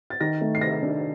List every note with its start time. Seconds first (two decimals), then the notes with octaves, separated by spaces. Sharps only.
0.10 A6
0.21 D#3 A#6
0.41 A3
0.55 C7
0.61 C3 A#6
0.82 D4